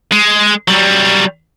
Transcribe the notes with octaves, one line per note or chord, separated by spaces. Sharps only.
G#3
F#3 G3